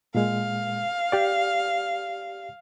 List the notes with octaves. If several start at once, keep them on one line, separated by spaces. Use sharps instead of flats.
A#2 G#3 F5
G4 D5